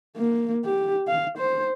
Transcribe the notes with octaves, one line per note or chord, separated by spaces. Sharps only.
A#3
G4
F5
C5